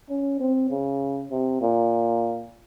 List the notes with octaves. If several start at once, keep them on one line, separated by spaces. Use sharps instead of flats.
C#4
C4
C#3
C3
A#2